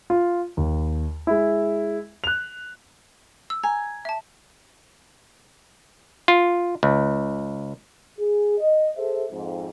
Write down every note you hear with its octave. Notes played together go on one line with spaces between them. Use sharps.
F4
D#2
G#3 E4
F#6 F7
E6
G#5 A#5
E5 A5
F4
C#2
G#4
D#5
G#4 A4 C5 E5
F2 G#2